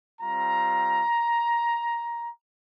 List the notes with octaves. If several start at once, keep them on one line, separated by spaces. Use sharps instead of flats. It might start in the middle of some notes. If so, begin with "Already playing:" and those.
G3 C4 F4 A#5